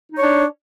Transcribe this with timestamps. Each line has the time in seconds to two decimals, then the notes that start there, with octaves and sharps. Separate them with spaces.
0.12 D#4
0.17 C#5
0.22 D4